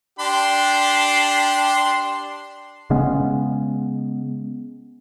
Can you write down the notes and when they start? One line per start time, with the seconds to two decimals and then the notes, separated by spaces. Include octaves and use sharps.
0.19 D4 G4 C6
2.90 C#3 G#3 B3 C#4